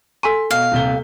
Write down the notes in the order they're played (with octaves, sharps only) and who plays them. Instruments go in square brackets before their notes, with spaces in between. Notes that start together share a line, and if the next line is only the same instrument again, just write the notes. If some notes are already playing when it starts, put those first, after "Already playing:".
[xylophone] A4 G#5 D#7 [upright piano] C6 B6
[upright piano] B2 [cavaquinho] F5
[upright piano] D#1 C3 G7